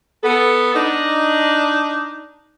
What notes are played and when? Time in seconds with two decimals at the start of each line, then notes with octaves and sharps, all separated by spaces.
0.24 B3 A4
0.75 D4 D#4